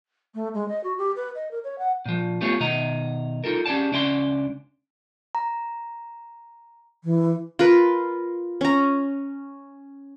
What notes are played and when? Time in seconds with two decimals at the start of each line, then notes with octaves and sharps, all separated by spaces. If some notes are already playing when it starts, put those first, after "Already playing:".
0.35 A3
0.54 G#3
0.68 D#5
0.84 F#4
0.98 G4
1.16 B4
1.35 D#5
1.51 A#4
1.64 C#5
1.79 F#5
2.06 A#2 F3
2.41 A3 B3 F4 G4 G#4 C#5
2.60 B2 D#3 D#5 A#5
3.44 D#4 F4 A4 A#4
3.66 C#4 G4 G#4 D5 A5
3.92 C#2 C#4 D4 D5 D#5 C6
5.35 A#5
7.04 E3
7.59 F4 A#4 B4
8.61 C#4 A#5